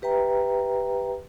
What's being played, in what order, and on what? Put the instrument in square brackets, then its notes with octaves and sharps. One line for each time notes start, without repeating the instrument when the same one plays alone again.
[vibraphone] G4 B4 E5 G5 A#5